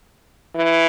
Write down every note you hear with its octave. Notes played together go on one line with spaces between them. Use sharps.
E3